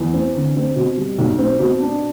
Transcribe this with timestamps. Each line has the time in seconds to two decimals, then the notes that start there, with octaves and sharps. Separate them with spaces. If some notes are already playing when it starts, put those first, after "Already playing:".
Already playing: E2
0.13 C4
0.34 D3
0.56 C4
0.76 B2
0.97 G3
1.18 B1
1.38 C4
1.59 B2
1.80 D4